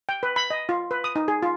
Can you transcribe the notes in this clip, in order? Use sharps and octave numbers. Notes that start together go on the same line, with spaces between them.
G5
B4
B5
D#5
F4
B4
D#6
D#4
G#4
F4